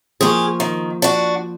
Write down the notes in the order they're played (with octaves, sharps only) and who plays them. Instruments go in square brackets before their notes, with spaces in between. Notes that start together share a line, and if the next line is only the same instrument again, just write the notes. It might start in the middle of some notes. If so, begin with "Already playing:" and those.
[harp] F3 A#3 C#6 [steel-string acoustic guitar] G4 G#4
[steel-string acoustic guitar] D#3
D4 F#4